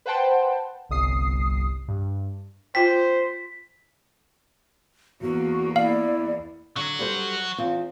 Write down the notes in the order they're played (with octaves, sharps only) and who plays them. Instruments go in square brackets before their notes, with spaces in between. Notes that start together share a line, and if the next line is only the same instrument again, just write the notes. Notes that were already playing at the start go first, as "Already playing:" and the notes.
[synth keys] B4 C5 F#5 G5 A5 C6
G1 C2 D#6 C7
G2
[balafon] F4 G5 [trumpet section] C5 [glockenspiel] B6
[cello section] E2 A#3 [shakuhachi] F#4
[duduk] E4 [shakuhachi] D5 [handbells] F5
[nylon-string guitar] D3 [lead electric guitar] F#3 F#4
[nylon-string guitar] G3 A4 C5
E2 C4 F4